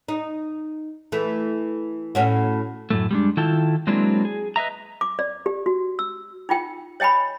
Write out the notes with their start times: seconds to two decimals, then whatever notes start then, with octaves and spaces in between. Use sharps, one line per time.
0.08 D#4
1.12 E3 A3
2.15 A2 C#4 F#4
2.90 F#2 A2 A3
3.11 G3 G#3 D4
3.37 D#3 E4 F4 A4 G5 A5
3.87 F#3 G#3 A#3 C4 D4 E4
4.25 G#4
4.56 B4 D#5 E5 A#5
5.01 D6
5.19 D5
5.46 G4
5.66 F#4
5.99 E6
6.49 D#4 F4 G5
7.00 C#5 D#5 G5 G#5 B5